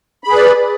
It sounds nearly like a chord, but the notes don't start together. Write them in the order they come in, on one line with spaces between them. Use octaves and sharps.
B5 G#4 B4 D5